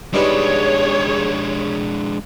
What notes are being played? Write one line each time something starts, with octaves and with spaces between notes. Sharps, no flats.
G3 G#3 D4 D#4 G#4 B4 C#5